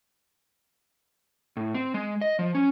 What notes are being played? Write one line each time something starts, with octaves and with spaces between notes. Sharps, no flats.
A2
C4
G#3
D#5
F3
C#4